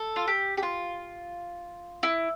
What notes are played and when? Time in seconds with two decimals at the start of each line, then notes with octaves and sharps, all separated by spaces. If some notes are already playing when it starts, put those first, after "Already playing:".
Already playing: A4
0.16 F4
0.28 G4
0.57 G4
0.63 F4
2.03 E4